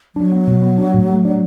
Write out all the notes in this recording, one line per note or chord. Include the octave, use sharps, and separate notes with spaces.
F#3 D4
B3
B2
B3
D4
A2
A3
D4